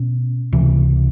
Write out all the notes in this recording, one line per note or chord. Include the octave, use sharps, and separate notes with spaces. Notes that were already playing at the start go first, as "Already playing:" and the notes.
Already playing: B2 C#4
C#2 C3 E3